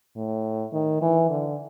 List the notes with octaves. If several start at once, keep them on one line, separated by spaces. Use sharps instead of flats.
A2
D#3
E3
D3